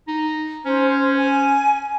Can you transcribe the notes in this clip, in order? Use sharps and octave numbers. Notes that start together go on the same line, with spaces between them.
D#4
C#4 C5
G#5